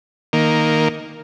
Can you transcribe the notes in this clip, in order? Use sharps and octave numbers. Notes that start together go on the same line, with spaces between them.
D#3 A#3